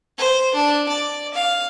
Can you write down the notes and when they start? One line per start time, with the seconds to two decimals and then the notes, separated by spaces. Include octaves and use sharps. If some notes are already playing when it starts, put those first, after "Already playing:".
0.18 C5
0.54 D4
0.89 D5
1.34 F5